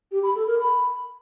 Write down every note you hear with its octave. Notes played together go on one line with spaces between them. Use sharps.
G4
B5
A4
A#4
B5